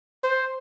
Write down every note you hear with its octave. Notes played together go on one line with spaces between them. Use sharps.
C5